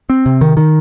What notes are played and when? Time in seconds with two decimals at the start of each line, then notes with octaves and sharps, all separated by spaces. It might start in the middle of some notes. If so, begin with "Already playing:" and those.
0.10 C4
0.26 C3
0.41 D#3
0.57 D#3